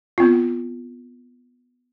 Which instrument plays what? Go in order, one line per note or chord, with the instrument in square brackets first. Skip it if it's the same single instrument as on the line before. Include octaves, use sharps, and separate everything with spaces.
[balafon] B3 C4 F4